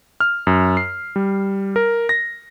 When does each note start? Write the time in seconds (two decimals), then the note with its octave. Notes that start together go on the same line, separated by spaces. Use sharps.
0.20 F6
0.47 F#2
0.77 C7
1.16 G3
1.76 A#4
2.09 A#6